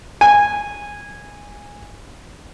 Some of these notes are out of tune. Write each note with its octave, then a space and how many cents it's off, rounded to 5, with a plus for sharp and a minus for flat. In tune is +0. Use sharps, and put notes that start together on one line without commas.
G#5 -15